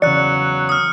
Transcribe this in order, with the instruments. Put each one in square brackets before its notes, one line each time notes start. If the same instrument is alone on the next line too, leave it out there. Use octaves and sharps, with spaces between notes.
[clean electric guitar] E2 C#3 [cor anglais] F#3 [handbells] D5 [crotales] F#6 C#7
[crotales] D#6 F6